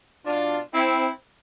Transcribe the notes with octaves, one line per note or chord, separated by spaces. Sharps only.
B2 D4 F4
C4 E4